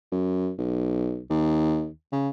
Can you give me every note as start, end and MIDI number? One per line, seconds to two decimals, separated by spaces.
0.12 0.51 42
0.58 1.22 35
1.30 1.89 39
2.12 2.29 49